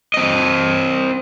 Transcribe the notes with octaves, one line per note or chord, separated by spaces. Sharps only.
C4 D#5